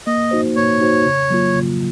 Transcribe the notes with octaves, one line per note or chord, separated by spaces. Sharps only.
A#3 D#5
D#4 F#4 C5
A#3 C#5
D#4 F#4 C5
C#3
F#3 A#3 F4
C#3